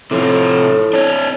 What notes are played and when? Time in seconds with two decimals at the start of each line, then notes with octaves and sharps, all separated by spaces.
0.11 A2 C3 F3
0.93 D4 C#5